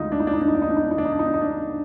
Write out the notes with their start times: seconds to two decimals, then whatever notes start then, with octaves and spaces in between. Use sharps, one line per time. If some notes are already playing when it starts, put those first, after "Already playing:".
Already playing: D2 D3 G#3 D#4 F4
0.12 D4
0.20 D#4
0.27 D4
0.34 D#4
0.42 D4
0.48 D#4
0.55 D4
0.62 D#4
0.69 D4
0.77 D#4
0.84 D4
0.91 D#4
0.98 D4
1.05 D#4
1.13 D4
1.19 D#4
1.27 D4
1.34 D#4
1.42 D4